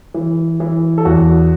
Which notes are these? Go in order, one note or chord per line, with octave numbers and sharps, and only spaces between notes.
E3
E3
A4
E2 F#4